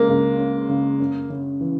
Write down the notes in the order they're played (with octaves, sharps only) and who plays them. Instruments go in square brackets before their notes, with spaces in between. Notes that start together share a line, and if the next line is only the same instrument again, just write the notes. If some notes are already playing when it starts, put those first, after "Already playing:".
Already playing: [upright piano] C#3 G#3 [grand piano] A#3
[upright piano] C#2
C#4
C#3
F#2
C#3
E3